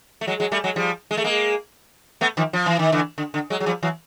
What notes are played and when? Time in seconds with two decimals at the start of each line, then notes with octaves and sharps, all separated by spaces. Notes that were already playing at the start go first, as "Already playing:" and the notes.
0.21 A3
0.27 F#3 G#3
0.40 F#3 G#3
0.52 G3 A3
0.64 F#3 G#3
0.76 F3 G3
1.11 G#3
1.17 A3
1.24 G#3 A#3
2.21 A3 B3
2.37 D#3 F3
2.53 F3
2.66 E3
2.79 D#3
2.92 D3 E3
3.18 D3
3.34 D3
3.50 F#3 G#3
3.60 F#3
3.66 F3 G3
3.83 E3 F#3